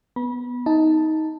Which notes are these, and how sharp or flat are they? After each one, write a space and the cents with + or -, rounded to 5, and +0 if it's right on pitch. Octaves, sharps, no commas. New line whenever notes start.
B3 +0 B5 -30
D#4 +15 A5 +0